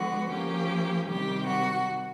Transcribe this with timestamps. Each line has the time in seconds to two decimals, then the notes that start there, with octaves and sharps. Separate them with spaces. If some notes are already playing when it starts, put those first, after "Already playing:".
Already playing: D3 F3 G#3 B3 F#4
0.31 F3 A#3 C#4 G4
1.08 C3 D#3 G3 G4
1.47 F#4